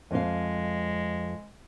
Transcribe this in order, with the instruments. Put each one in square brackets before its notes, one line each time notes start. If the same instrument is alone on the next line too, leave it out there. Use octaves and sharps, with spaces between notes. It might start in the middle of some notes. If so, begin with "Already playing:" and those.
[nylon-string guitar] F2 F5 [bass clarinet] G#3